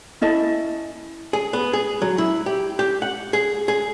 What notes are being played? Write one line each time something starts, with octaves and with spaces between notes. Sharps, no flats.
C#4 E4 D#5 A5
G#4
B3
G#4
F#3
E4
G4
G4
F#5
G#4
G#4